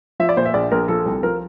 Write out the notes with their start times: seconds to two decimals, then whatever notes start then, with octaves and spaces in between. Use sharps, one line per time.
0.20 F3 E5
0.29 D5
0.37 A#2 C5
0.45 E5
0.54 A#1 D5
0.72 A#1 A#4
0.88 F3 A4
1.06 C2
1.23 F3 A#4